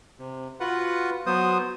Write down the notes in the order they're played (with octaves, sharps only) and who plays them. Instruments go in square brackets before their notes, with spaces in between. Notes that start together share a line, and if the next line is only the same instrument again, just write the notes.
[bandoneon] C3
F4 F#4 B4 F#5
F#3 B3 C5 D#6